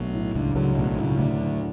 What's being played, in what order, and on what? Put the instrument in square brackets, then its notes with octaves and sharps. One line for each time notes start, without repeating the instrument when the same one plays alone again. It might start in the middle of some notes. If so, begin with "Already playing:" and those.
Already playing: [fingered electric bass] B1 B2 [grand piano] F#3 A3 D4
[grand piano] A2
[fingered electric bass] C#2 C#3 [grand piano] D4
[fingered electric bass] C#2 C#3 [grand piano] F#3
[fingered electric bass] B1 B2 [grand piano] A3
[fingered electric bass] C#2 C#3 [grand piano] A2
[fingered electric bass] D2 D3 [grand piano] D4
[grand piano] F#3